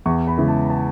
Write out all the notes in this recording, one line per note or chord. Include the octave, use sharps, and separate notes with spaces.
E2 C#6
B5
C#3 E3 G#3
A5
A5